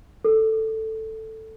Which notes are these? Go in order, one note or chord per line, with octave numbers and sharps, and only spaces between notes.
A4